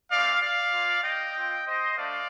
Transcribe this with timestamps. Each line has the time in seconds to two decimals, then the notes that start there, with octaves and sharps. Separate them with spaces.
0.11 A3 C4 G4 D5 F5
0.42 D5 F5
0.73 A#3 F4
1.04 D#5 G5
1.35 C4 F4
1.67 C5 D#5
1.98 A3 D4 D5 F5